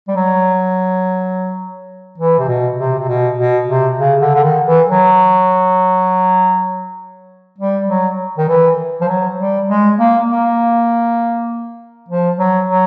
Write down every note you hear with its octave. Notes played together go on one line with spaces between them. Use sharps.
G3
F#3
E3
C3
B2
C3
C3
B2
B2
C3
C#3
D3
D3
D#3
E3
F#3
G3
F#3
D#3
E3
F3
F#3
G3
G#3
A#3
A#3
F3
F#3
F#3